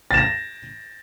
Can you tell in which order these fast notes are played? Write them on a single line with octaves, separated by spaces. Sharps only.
A6 E7 A#6